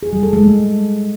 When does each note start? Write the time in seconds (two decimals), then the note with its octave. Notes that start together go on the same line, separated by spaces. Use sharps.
0.03 G#4
0.13 G3
0.23 A4
0.33 G#3
0.43 A3